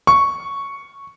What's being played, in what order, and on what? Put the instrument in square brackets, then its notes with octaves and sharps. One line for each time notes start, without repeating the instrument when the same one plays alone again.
[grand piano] C#6